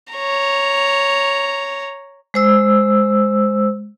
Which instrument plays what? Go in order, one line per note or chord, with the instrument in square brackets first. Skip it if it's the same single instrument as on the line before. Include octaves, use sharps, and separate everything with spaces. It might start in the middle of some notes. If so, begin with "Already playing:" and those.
[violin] C#5 A#5
[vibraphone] G#3 C5 E6